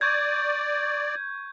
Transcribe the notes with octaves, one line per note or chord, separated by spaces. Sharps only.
D5 C#6 G6 G#6